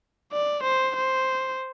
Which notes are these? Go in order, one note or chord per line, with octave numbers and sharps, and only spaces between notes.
D5
C5
C5